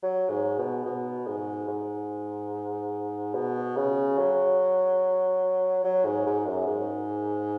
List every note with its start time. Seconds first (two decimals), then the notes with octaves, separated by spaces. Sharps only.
0.03 F#3
0.30 G#2
0.58 B2
0.86 B2
1.27 G#2
1.68 G#2
3.34 B2
3.76 C#3
4.18 F#3
5.84 F#3
6.05 G#2
6.26 G#2
6.46 F#2
6.67 G#2